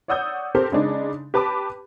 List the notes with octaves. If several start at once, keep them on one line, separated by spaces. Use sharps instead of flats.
C#5 D5 F#5 D#6 E6 G6
C4 G4 A4 A#4 C5
C#3 G#3 D4 D#4
G4 B4 A5 B5 D6